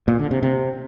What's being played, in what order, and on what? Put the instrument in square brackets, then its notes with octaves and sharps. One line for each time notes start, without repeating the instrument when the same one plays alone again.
[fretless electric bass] A#2
D3
C3
C3